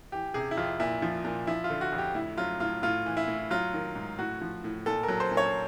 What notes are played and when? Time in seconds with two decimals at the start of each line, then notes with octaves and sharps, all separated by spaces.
0.12 E3 G4
0.34 C3 G#4
0.51 E4
0.57 F2 F4
0.80 A#2 E4
1.02 F3
1.25 A#2
1.47 F3 E4
1.64 F4
1.70 D3
1.81 F#4
1.92 F2
1.98 G4
2.15 A2 E4
2.38 F#3 F4
2.60 A2 F4
2.83 A2 F4
3.06 E3
3.17 E4
3.28 A2
3.51 F#3 F4
3.74 D#3
3.95 G#2
4.19 A2 F#4
4.41 F3
4.64 A2
4.86 A#2 A4
5.03 A#4
5.09 F#3
5.20 C5
5.31 A#2
5.37 C#5